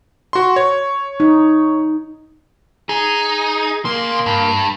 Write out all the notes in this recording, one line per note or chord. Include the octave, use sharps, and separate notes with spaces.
F#4 C6
C#5
D#4
D#4 G#4
C#3 A#3 C6
G2